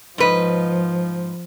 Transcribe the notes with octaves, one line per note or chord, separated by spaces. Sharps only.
G#2 F3 B4 D#5